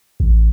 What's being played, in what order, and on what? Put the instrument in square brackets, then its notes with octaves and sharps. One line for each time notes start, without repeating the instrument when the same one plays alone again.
[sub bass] A1